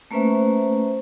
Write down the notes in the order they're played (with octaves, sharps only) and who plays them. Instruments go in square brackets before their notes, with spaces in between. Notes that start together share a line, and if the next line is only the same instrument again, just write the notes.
[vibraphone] A3 A#3 C#4 B4 C5 E5